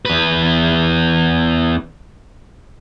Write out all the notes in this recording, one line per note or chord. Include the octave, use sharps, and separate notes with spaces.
E2 B4